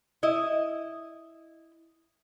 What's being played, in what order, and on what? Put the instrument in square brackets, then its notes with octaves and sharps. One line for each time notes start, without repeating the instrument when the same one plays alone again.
[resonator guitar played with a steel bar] E4 D#5